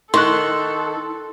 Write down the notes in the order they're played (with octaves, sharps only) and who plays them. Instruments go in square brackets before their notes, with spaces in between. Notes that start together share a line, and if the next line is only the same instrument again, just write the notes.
[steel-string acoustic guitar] D#3 [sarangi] A4 [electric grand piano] C6 C#6 F#6